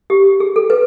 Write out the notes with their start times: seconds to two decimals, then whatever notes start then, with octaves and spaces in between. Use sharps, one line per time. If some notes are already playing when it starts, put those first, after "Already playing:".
0.10 G4
0.40 G#4
0.56 A4
0.70 B4